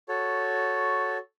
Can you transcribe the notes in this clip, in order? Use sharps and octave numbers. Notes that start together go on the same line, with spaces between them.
F#4 A4 C#5